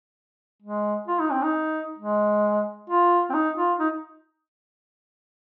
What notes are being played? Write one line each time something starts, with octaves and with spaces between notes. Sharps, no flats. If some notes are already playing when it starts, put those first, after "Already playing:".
G#3
F4
D#4
C4
D#4
G#3
F4
C4
D#4
F4
D#4